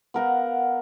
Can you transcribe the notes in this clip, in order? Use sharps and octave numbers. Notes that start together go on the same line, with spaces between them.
B3 A#4 F5 F#5